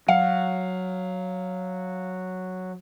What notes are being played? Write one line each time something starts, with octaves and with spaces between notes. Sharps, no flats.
F#3 F5 F#5